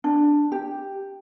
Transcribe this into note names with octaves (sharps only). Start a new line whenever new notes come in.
D4
G4